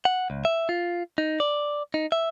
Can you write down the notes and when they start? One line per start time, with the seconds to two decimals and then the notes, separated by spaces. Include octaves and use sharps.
0.05 F#5
0.30 C#2
0.45 E5
0.69 F4
1.18 D#4
1.40 D5
1.94 D#4
2.12 E5